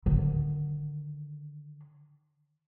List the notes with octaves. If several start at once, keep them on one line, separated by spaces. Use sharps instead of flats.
D3 D#3